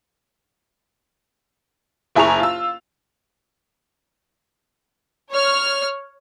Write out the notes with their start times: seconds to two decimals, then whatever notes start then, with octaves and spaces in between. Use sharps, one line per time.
2.15 F#1 E4 G#4 A#5 C#6 F7
2.40 F4 E6
5.31 C#5 F6